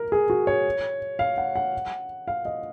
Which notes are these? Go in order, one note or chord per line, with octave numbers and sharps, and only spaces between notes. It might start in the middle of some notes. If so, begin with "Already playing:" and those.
Already playing: A#4
G#4
F#4
C#5
F5
F#5
F#5
F5
D#5